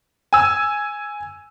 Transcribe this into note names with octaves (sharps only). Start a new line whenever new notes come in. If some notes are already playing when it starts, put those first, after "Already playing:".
G#5 E6